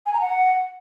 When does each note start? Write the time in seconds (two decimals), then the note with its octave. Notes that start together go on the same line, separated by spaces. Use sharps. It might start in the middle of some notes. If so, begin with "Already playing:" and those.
0.06 G#5
0.13 A#5
0.21 F#5